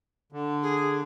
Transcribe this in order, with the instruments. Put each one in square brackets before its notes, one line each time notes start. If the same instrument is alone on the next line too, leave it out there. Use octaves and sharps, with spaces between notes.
[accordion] D3
[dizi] G#4